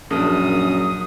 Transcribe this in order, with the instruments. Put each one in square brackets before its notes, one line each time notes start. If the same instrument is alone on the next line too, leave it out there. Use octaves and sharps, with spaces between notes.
[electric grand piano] A#1 [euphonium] F#2 [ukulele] D4 G#4 A#4 [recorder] D#6